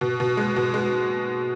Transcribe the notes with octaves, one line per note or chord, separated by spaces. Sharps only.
B2
B2
G#3
B2
G#3